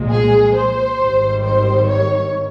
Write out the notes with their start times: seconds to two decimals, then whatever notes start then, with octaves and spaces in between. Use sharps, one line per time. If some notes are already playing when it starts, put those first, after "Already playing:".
Already playing: C2 A#2 F3 G#3
0.10 G#4
0.54 C5
0.98 G#1 G#2 D#3 G3
1.43 C5
1.87 C#5